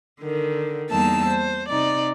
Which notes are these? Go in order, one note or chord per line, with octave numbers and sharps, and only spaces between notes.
D3 D#3
E2 G3 A#3 D#4 A5 E6
C5
C3 D#4 D5